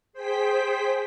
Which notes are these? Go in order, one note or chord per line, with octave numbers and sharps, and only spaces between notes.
G#4 C5 G5 B6